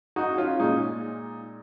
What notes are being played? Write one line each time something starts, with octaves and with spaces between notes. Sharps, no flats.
D#4 F#4
C#4 F4
A#2 G#3 D#4